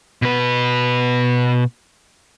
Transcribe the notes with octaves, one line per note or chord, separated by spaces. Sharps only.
B2 B4